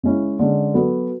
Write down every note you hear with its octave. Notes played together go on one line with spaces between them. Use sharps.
C#3 G#3 C#4 E4
D3 G#3 C#4
F#3 B3 F#4 A4